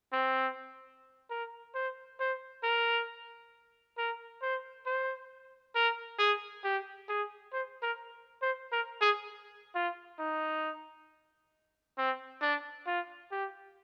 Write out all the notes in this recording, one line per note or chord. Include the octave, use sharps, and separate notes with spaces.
C4
A#4
C5
C5
A#4
A#4
C5
C5
A#4
G#4
G4
G#4
C5
A#4
C5
A#4
G#4
F4
D#4
C4
D4
F4
G4